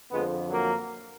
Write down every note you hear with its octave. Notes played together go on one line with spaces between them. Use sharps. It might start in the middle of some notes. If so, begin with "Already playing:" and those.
F2 D3 F3 G#3 B3
F#3 A#3